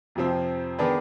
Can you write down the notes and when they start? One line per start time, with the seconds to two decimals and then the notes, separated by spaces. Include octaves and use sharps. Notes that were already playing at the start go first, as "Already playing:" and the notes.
0.15 F2 C3 F3 C4
0.78 D#3 B3 D4 G#4 B4